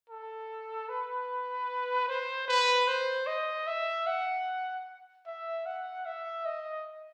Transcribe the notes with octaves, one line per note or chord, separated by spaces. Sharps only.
A4
B4
C5
B4
C5
D#5
E5
F#5
E5
F#5
E5
D#5